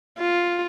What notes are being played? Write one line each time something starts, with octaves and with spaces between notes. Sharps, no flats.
F4